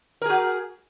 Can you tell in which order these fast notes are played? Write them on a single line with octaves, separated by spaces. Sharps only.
A#4 G#4 F#4